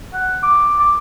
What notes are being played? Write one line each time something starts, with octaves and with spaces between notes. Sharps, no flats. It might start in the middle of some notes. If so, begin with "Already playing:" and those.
F#5
D6
D6